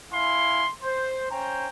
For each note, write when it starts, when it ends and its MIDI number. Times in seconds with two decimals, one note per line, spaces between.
0.12 0.64 64
0.12 0.64 77
0.12 0.64 80
0.12 0.64 84
0.82 1.25 72
1.30 1.67 61
1.30 1.67 72
1.30 1.67 79
1.30 1.67 82